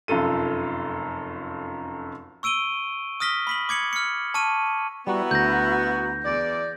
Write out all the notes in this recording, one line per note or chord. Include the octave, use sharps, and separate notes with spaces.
F1 F#2 F4 A4 D#7
C#6 E6 D7 D#7 G7
D#6 F6 A#6 B6 G7
B5 B6 F#7
D6 G#6 C#7 F#7
F6 C#7
A5 C#6 F6 D#7
G3 B3 E4 F#4 F#5 A#5
D2 G6 A#6
E2 D5